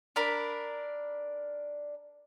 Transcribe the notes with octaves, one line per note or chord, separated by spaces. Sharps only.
D4 A#4 B5